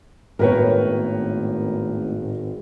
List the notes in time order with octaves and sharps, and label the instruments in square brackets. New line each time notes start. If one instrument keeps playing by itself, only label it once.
[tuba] G#1 [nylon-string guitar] A2 [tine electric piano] A3 B3 G5 [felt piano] A#4 B4 C#5